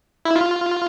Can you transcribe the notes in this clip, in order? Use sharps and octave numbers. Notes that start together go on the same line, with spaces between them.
E4
F4